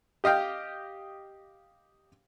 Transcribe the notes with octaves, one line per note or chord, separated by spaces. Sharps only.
G4 D#5 F5 G5